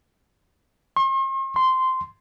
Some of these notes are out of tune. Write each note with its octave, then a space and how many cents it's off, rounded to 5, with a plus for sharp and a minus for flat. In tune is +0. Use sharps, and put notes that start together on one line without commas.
C6 +45
C6 -10